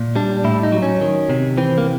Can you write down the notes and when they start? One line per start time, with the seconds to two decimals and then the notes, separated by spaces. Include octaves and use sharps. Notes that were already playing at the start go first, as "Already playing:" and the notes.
Already playing: A#2
0.16 G3 D4
0.44 A2 E4
0.63 D#4
0.72 F#3
0.82 C#4
1.01 D#3
1.29 C3
1.57 E3 C4
1.78 A#3